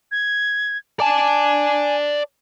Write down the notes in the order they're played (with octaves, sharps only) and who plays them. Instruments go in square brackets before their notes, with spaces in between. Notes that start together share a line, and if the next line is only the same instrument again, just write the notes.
[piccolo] G#6
[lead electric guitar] D5 A5 [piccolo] G#5